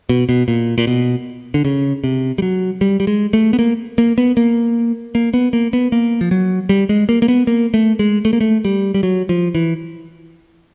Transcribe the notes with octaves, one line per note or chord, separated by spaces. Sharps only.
B2
B2
A#2
A#2
B2
D3
C#3
C3
G3
F#3
G3
G3
G#3
A3
B3
A#3
A#3
B3
A#3
A#3
B3
A#3
B3
A#3
F3
F#3
G3
G#3
A#3
A#3
B3
A#3
A3
G#3
A3
A#3
A3
G3
G3
F#3
F3
E3